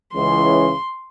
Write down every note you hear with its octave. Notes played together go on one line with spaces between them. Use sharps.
C#2 C#3 E3 C6